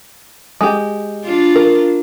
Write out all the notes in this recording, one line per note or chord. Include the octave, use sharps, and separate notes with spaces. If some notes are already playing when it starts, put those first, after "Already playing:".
G#3 G4
D4 F4
A#4